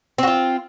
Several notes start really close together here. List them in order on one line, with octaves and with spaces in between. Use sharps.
C4 F#4 F4